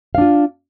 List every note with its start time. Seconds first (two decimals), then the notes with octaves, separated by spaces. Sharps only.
0.15 F5
0.18 D4
0.21 F4